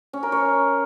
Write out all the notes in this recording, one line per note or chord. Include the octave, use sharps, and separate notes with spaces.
C#4
A#4
C#5